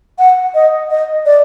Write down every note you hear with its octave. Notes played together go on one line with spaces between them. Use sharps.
F#5
D#5
D#5
D5